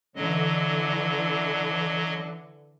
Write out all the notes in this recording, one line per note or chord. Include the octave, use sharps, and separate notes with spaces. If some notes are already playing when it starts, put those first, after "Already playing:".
D3 E3 F#3 D#5